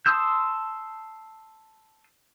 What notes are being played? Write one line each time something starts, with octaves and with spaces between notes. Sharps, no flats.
A5 C6 D#6 E6 G6